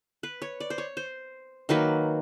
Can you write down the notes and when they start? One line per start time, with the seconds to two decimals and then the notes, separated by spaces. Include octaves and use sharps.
0.23 B4
0.42 C#5
0.60 D5
0.70 C5
0.78 C#5
0.97 C5
1.69 D#3 F#3 A#3 B4